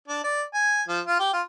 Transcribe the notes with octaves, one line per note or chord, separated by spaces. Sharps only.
D4
D5
G#5
F3
F4
G4
F4